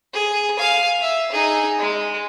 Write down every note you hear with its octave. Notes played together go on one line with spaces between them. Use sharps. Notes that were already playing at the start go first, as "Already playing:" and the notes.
G#4
F5 G#5
E5
D#4 G#4
G#3